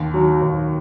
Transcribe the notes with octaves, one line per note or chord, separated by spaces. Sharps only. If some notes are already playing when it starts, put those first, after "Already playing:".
Already playing: D#2
F#3
D#2